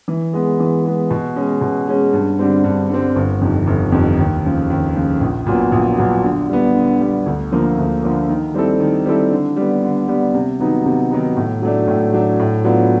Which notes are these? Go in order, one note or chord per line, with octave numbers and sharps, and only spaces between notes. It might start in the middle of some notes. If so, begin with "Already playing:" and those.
E3
G#3 B3
E3
G#3 B3
B2
G#3 C#4
B2
G#3 C#4
G2
D3 G3 C4
G2
D3 G3 C4
G1
F2 C3 D#3
G1
F2 C3 D#3
D#2
C#3 F3
D#2
C#3 F3
A#1
A#2 F#3 B3
A#1
A#2 F#3 B3
D3
G3 B3
D3
G3 B3
D2
D3 F3 A#3
D2
D3 F3 A#3
D#3
G3 C4 E4 A4
D#3
G3 C4 E4 A4
D3
G3 B3
D3
G3 B3
C3
D#3 F#3 B3 D#4
C3
D#3 F#3 B3 D#4
A2
F#3 A3 D4
A2
F#3 A3 D4
A2
F#3 B3 D4 F4